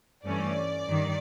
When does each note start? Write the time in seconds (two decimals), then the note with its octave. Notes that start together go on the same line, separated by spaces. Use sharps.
0.25 G2 E3 A3 C#4 D5
0.87 G2 D#3